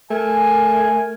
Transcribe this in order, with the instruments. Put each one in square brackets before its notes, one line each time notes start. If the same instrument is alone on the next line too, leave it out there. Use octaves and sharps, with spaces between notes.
[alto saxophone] A3 [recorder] A#4 [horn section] G#5